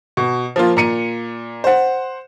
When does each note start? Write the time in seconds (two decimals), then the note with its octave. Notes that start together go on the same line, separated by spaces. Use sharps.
0.17 B2
0.56 F3 A#3 F4
0.77 A#2 A#5 C#7 D#7
1.64 C5 F#5